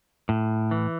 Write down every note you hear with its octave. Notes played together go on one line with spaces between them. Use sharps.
A2
E3